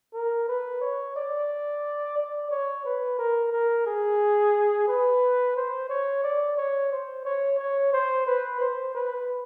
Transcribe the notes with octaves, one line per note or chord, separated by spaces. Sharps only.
A#4
B4
C#5
D5
D5
C#5
B4
A#4
A#4
G#4
B4
C5
C#5
D5
C#5
C5
C#5
C#5
C5
B4
C5
B4